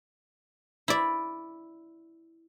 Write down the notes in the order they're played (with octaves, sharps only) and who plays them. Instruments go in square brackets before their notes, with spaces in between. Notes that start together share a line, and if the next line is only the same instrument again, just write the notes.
[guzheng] E4 D5